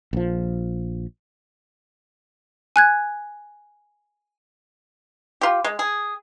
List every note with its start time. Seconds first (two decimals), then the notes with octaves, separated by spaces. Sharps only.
0.13 A#1 F3
2.76 G#5 F#6 G#6
5.41 F4 G4
5.64 G#3
5.79 G#4